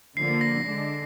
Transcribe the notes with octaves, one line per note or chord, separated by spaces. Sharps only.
D3 F3 A#3 C7
A#6
D3 G#3 D4